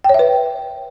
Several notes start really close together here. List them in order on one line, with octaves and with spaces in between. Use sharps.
G5 C#5 E5 B4